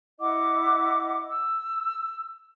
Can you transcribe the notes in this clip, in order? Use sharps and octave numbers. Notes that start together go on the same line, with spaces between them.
E4 D#5 F#5 D6
E6